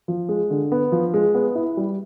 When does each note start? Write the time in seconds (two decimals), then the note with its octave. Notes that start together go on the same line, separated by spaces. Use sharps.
0.08 F3
0.29 G#3
0.50 D3
0.72 B3
0.92 F3
1.14 G#3
1.35 B3
1.55 E4
1.77 G3